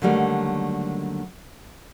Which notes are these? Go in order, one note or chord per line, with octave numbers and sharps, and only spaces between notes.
D3 D#3 F#3 G3 A3 A#3